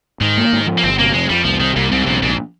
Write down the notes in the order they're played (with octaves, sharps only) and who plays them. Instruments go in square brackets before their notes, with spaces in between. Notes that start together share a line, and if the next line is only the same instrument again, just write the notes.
[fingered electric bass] G#2 [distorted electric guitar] D#3
[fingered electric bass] A#3
G#2
F3
[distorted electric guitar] A#3
[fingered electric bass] G1 [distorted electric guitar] C4
[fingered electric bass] C3 [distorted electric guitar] A#3
[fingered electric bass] F2 [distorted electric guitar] G#3
[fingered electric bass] F2 [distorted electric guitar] G3
[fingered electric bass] C2 [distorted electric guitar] F3
[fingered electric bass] C3 [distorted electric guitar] D#3
[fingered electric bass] C2 [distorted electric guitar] A#2
[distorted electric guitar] G#2 [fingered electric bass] C3
[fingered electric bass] A#1 [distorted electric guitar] G2
[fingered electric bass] A#1 [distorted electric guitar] G#2